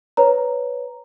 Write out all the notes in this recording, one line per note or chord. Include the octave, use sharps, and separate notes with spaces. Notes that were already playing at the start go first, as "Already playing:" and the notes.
B4 C#5 A#5